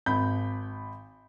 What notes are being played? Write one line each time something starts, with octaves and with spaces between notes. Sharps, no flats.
G#1 B5 G6